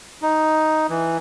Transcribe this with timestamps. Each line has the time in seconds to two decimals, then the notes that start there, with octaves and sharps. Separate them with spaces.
0.22 D#4
0.90 E3